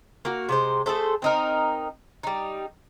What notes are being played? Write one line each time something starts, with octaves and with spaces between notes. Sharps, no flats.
A#3 F#4
C3 G#3 C5
A3 G#4 A4 C5
C4 D#4 A#4
G3 D#4